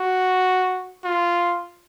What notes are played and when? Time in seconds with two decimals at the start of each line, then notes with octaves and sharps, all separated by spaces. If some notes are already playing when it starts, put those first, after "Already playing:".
Already playing: F#4
1.04 F4